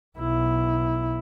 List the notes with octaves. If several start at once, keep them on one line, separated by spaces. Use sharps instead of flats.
B1 E4